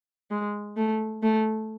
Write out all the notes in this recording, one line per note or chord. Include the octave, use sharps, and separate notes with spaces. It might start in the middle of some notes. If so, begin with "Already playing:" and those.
G#3
A3
A3